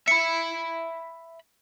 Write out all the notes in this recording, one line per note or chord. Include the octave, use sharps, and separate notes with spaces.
E5 B5 C#7